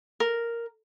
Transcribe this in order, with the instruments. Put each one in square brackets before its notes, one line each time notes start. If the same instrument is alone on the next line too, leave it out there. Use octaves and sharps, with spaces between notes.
[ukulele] A#4